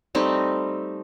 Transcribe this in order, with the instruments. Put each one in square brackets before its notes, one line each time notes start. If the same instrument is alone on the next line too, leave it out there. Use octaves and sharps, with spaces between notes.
[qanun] G3 A3 C4 D#4